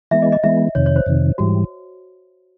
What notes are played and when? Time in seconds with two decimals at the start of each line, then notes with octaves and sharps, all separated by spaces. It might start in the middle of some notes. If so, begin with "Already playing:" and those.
0.11 E3 G#3 B3 E5
0.22 D#5
0.32 D#5
0.44 E3 G#3 B3 E5
0.75 F2 C3 D#3 C#5
0.86 C#5
0.96 C5
1.06 F2 C3 D#3
1.38 G#2 E3 G3 F#4